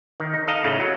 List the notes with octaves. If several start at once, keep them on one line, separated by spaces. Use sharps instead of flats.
D#3
D#4
A4 D#5 F5 A#5
A2 C#3 A3
F#3